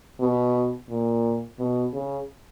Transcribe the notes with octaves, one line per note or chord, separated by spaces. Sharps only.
B2
A#2
B2
C#3